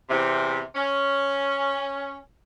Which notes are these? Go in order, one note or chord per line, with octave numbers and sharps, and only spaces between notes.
E2 C3
C#4